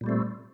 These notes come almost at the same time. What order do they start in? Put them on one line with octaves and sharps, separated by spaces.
A#2 G3 A3 C4